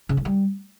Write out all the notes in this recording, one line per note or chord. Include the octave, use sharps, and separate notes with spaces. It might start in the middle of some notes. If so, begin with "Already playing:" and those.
C#3
G2
G3